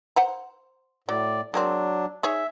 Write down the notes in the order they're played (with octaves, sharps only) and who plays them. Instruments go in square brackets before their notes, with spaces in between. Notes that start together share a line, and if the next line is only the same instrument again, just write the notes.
[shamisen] C5 F#5 A#5
[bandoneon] A2 D5 [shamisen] F#3
[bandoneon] F#3 D4 [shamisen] G#3 A#3 C4
[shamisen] D#4 G#4 C#5 [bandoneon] E5